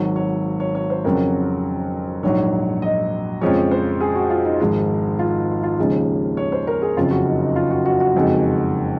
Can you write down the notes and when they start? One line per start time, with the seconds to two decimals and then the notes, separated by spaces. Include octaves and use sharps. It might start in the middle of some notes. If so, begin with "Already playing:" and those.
Already playing: G#1 G#2 F#3
0.16 C#5
0.60 C#5
0.75 C#5
0.90 C5
1.05 F2 C#3 F#3 A#4
2.23 A#1 G#2 D#3 F#3 C#5
2.82 D#5
3.41 F2 C#3 F3 G#3 C#5
3.71 C5
4.00 G#4
4.15 F#4
4.30 F4
4.45 D#4
4.60 G#1 G#2 F3 G#3
5.19 F4
5.63 F4
5.78 D#2 C#3 F3 G#3
6.37 C#5
6.52 C5
6.67 A#4
6.82 G#4
6.97 F#1 F2 C#3 F4
7.11 F#4
7.26 D#4
7.41 D#4
7.56 F4
7.71 F#4
7.86 F#4
8.00 F#4
8.15 F#1 F2 D#3 G#3